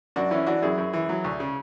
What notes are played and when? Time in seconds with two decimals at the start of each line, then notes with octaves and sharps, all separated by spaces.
0.16 F#2 D4 F#4
0.31 E3 C#4 E4
0.46 E3 D4 F#4
0.62 F#2 E4 G#4
0.78 F#2
0.93 E3
1.09 F#3
1.24 D2
1.40 C#3